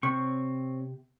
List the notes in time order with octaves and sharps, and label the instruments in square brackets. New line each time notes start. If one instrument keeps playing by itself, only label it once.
[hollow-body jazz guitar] C3 [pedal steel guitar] C4 C#5 C#6